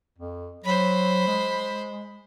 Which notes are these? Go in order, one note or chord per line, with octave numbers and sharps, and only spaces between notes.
F2
F#3 C5 B5
G#3